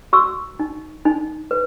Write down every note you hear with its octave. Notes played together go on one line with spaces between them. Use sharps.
F#4 C#6 E6
D#4
D#4
B4